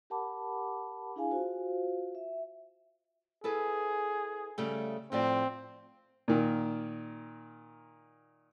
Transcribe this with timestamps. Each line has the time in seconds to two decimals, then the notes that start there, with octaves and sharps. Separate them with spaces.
0.10 G4 A#4 F#5 A5 B5 D6
1.16 D4 E4 G#4 F5 G#5
1.31 F4 F#4 C5 F5
2.15 E5
3.44 E4 G#4 A4 B4
4.58 C#3 G3 A3
5.12 A2 F3 C4 D5
6.28 A#2 D#3